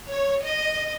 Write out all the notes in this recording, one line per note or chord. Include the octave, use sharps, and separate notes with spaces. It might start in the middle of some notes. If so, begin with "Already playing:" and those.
C#5
D#5